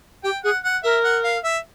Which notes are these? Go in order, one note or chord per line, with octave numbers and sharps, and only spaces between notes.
G4 G5
G#4 F#5
F#5
A#4 E5
F#5
F5
E5